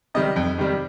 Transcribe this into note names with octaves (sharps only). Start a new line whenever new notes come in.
C3 D#3 G3 D#5
F2
C3 D#3 G3